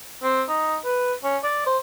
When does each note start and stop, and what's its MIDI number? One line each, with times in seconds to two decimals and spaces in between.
0.23 0.43 60
0.49 0.77 63
0.85 1.13 71
1.24 1.37 61
1.44 1.67 74
1.67 1.78 72